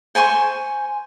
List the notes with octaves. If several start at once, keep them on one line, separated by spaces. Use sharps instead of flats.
C5 G#5 C6 C#6